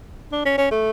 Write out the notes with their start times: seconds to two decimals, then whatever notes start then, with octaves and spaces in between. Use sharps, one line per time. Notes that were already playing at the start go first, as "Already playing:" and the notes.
0.32 D4
0.45 C#4
0.58 C#4
0.71 A3